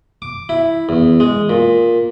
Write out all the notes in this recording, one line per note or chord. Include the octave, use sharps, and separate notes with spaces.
D6
E4
E2
G#3
A#2